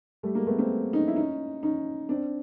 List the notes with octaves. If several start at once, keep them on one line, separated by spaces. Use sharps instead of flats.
G3 A3
G#3 A#3
A3 B3
A#3 C4
C#4 D#4
E4
C#4 D#4
C#4 D#4
C4 D4